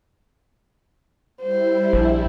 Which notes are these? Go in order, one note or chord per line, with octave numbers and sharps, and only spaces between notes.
G3 E4 C5
A#1